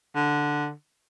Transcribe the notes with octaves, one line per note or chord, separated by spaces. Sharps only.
D3